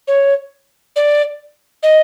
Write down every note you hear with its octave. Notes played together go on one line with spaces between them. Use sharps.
C#5
D5
D#5